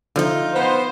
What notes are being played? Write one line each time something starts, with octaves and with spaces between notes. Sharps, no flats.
D3 F3 D#4 F4
B3 C5